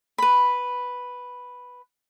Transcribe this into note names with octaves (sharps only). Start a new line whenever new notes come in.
B4 B5